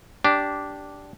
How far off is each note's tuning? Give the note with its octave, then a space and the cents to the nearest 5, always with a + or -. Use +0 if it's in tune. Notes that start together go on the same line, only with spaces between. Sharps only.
D4 -10 G4 -5